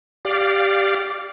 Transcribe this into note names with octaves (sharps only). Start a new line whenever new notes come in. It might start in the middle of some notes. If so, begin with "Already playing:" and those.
G4 D5 F5